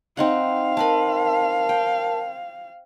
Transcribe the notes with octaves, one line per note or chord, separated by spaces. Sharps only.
C4 D#4 F5 F#5
C4 A#4 B4 A5 B5
G5